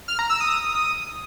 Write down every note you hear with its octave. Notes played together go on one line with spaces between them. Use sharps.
F6
A#5
E6
D#6